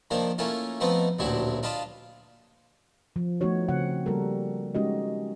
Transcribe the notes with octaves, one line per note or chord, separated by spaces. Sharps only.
D#3 F3 A#3 D4 C5
A3 A#3 C#4 E4 F4
F3 A3 B3 C4 D#4 B4
A1 D2 A#2 F#3 D4 E4
D4 F4 D#5 F5 A5 B5
F3
F3 A3 B3 D#4 F#4 C#5
C#3 C4 F#5
G3 A#3 F#4 A4 A#4
G#3 C#4 D#4 F#4 G4 D#5